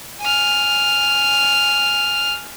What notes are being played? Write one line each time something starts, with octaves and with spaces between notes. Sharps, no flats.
G#5 F6